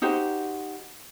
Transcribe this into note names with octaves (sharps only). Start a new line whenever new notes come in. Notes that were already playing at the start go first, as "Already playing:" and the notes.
D#4 F#4 G4 C5